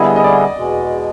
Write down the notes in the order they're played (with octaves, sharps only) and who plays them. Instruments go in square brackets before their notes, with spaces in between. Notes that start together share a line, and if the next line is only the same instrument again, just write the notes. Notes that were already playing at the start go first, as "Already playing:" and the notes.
Already playing: [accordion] D3 G3 B3 E4 G#4 [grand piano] D#5
[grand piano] D#5
D5
[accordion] E2 B2 G#3